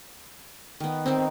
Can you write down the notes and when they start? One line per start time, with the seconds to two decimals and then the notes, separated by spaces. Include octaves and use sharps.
0.80 D#3 B3
1.06 D#3 C4 D#4